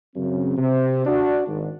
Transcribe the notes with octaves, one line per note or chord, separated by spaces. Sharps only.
F#2 C#3 C4
C3
D4 F#4
G#1